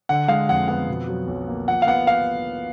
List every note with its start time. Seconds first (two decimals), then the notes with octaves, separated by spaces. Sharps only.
0.09 D3 F#5
0.28 G#3 F5
0.49 F2 F#5
0.68 B3 F#5
0.88 B2
1.08 F#3
1.28 B1
1.48 A#3
1.68 F3 F#5
1.82 F5
1.87 B3 F#5
2.07 F5